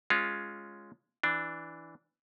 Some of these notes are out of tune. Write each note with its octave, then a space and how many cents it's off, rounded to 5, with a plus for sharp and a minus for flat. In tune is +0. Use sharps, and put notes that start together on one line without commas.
G#3 +0 C#4 +0 F4 +0
E3 +0 D4 +0